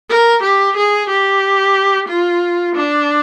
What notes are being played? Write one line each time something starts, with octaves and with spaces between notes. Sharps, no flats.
A#4
G4
G#4
G4
F4
D4